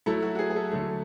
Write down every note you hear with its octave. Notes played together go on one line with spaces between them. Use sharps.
F#3 A3 E4 A4
F#4
F#4
G#4
G#4
A4
D3 F#3 A3